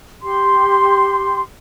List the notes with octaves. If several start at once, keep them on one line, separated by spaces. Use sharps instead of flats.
G4 C6